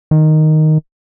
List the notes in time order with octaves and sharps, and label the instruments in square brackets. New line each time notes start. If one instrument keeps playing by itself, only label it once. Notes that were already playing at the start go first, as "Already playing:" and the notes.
[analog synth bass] D#3